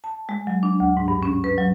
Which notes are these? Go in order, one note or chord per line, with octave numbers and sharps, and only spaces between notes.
A5
G#3
F#3
D4
D2
G#2
G2
C#4
B4
F#3